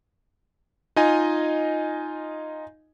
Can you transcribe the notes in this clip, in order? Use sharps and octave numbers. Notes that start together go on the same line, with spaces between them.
D#4 F4 D#5 G#5